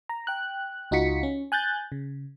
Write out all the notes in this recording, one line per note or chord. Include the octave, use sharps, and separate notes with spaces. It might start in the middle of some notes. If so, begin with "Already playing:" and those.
A#5
G5 F#6
C#2 D#4 F4 F#4 B6 C#7
C#4
G#5 F#6 G6 A6
C#3